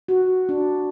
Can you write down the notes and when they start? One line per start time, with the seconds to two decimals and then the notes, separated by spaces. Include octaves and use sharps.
0.08 F#4
0.49 D4